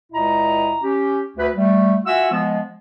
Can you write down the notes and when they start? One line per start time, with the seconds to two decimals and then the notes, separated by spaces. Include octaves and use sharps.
0.13 C#2 A#2 E4 D#5 A#5
0.83 C#4 G4
1.37 D2 B4
1.55 G3 A3
2.05 F4 F#4 E5 F#5 G#5 E6
2.31 F3 G#3 B3